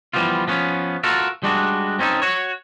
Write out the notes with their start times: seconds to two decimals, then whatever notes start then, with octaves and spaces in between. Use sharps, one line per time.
0.13 E3 F3 G3 B3 F4
0.48 F3 B3 C#4
1.04 F4 F#4 A4 A#4
1.43 G3 G#3 D4 F#4
1.99 C4 C#4 D#4 A4
2.22 F#4 C#5